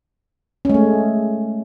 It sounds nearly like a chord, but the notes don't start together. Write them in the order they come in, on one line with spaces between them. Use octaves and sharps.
C#4 G#3 A3